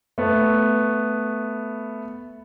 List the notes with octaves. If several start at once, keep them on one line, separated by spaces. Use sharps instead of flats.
A3 B3